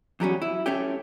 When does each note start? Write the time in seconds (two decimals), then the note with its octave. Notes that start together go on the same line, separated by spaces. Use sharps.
0.20 E2 F#3 G3 C#4
0.42 E4
0.66 A3 C#4 G4